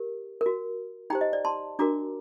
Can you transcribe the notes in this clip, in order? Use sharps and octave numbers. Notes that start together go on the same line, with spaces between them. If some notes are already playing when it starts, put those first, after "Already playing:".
Already playing: G4 A#4
A#4
F#4
D#4 G4 C5 G5 A#5
D#5
D5
A5 C6
D4 F#4 A#4 A#5 D6